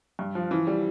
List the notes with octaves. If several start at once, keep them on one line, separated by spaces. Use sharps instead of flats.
G2
F3
E3
G3